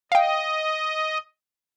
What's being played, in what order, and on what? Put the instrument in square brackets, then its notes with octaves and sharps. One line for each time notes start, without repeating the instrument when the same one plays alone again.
[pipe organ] D#5 [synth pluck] F5 G5